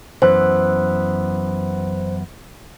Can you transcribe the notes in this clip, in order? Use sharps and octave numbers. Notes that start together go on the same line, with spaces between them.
F#2 E3 B3 C5